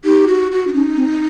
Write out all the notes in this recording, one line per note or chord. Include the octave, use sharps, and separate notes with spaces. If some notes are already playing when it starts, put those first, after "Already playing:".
D#4 G4
F#4
F#4
D4
C#4 D#4
C4